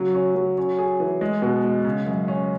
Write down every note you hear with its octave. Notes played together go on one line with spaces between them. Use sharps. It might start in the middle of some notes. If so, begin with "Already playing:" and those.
Already playing: C#3 F#3
C#4
F#3
C#4
G#4
E3
G#3
B2
G#3
C#3
F#2
C#4